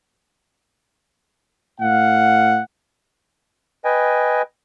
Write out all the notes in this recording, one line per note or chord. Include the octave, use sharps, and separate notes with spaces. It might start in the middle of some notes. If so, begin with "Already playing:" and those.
A2 F5 F#5
B4 D#5 G5 G#5